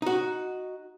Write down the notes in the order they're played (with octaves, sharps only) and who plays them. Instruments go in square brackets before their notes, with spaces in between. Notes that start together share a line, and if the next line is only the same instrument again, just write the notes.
[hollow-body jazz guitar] D#4 F#4